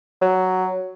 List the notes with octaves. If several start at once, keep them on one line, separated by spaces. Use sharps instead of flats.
F#3